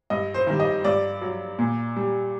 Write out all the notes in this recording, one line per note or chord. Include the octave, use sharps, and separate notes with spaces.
G2 D#5
C5
D#3 G3
D#5
G2 D5
F#3
A#2
G3